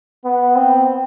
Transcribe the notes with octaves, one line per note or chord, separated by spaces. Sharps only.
B3
C4